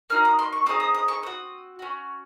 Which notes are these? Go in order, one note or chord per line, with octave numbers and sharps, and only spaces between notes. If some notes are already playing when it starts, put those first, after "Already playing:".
A#3 D#4 F#4 F6
D#6
C6
C#6
C4 D#4 G#4 D#6
D#6
D#6
C#6
C4 F#4 D#6
C#4 F#4